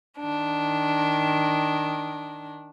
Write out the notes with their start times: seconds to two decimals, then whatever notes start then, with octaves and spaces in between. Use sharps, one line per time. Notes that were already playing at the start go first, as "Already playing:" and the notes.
0.20 D#3 D4